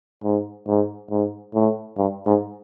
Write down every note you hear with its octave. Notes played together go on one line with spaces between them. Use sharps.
G#2
G#2
G#2
A2
G2
G#2